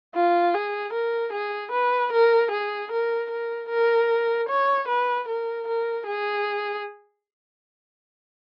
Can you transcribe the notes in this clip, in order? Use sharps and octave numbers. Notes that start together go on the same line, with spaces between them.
F4
G#4
A#4
G#4
B4
A#4
G#4
A#4
A#4
A#4
C#5
B4
A#4
A#4
G#4